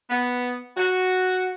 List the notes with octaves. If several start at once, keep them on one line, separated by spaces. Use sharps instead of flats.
B3
F#4